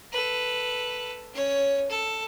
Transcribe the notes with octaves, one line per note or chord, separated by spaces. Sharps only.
A4 B4
C#4 C#5
A4